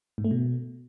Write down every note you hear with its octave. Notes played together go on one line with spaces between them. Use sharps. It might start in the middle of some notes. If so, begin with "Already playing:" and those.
G#2
A3
B2